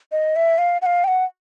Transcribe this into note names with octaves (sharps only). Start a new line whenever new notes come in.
D#5
E5
F5
F#5
F5
G5
F#5